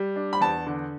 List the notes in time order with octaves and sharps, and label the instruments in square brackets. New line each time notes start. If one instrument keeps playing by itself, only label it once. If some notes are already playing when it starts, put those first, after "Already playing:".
Already playing: [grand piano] G3
D4
[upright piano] B5
[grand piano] E2 [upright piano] A5
[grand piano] D3